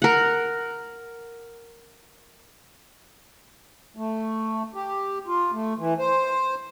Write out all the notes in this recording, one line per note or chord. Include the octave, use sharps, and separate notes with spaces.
A#4 F#5
A3
G4
F4
A3
E3
C5